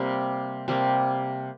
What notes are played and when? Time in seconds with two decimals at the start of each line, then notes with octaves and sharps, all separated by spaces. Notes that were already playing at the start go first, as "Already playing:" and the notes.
Already playing: C3 G3 A#3
0.68 C3 G3 A#3